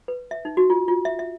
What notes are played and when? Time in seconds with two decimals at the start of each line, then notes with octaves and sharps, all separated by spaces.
0.08 B4
0.31 E5
0.45 D#4
0.57 F#4
0.70 F4
0.88 F4
1.05 E5
1.19 E5